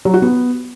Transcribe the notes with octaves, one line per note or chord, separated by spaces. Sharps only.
F#3
F#4
B3